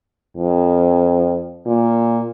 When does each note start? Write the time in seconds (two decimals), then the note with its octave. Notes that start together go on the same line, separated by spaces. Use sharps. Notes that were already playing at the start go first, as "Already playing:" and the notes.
0.37 F2
1.66 A#2